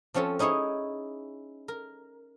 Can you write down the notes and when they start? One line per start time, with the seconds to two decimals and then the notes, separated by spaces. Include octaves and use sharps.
0.14 F3 C4 C#4 F4 A4
0.39 C#4 D#4 E4 G#4 C#5
1.68 A#4